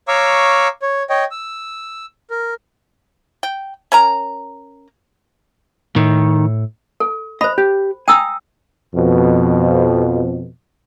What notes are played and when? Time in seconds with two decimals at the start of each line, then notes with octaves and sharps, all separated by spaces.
0.08 C#5 F5 A#5 C#6 D6 E6
0.82 C#5
1.10 C#5 D#5 G5
1.31 E6
2.30 A#4
3.43 G5
3.92 C#4 A#4 A#5
5.96 A2 D#3
7.00 A4
7.41 C5 D#5 B5
7.58 G4
8.08 G5 G#5 A#5 D#6 E6
8.94 F2 B2